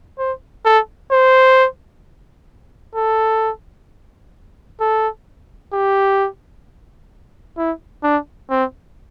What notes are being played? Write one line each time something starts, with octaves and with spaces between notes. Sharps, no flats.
C5
A4
C5
A4
A4
G4
E4
D4
C4